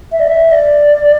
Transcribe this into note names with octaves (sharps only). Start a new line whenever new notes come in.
E5
D5
E5
D5